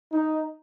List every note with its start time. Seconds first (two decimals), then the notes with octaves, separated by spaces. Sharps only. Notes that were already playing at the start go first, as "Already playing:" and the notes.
0.12 D#4